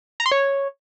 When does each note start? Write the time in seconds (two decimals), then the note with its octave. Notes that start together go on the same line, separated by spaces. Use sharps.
0.20 A#5
0.26 C6
0.31 C#5